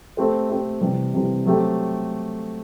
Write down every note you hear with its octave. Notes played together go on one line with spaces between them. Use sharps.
A3 C4 G4 C5
A3 C4 G4 C5
C3 E3 G3
C3 E3 G3
F#3 A3 C4 G4